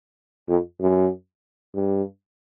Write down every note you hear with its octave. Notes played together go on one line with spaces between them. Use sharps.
F2
F#2
G2